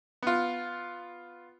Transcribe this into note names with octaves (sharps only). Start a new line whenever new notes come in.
B3 F4